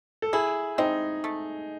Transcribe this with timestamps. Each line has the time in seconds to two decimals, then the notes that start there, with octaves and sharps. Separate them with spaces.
0.22 A4
0.33 E4 G#4
0.78 C4 D#4
1.24 A3